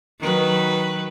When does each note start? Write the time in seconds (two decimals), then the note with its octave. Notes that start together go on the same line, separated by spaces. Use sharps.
0.20 D#3 F#3 B4